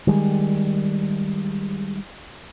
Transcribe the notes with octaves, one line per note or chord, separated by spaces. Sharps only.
D#3 G3 G#3